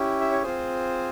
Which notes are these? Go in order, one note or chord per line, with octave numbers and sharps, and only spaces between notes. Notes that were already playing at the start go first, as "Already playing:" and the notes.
Already playing: C#4 E4 G4
E5
C#5
C4 F4 G#4 C5